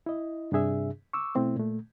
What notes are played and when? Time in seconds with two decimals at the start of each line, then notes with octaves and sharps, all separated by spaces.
0.06 E4 D#5
0.52 G2 C3 D4 G#4 E5
1.13 C#6 D6 E6
1.35 B2 A3 C4 E4
1.56 A#2 A3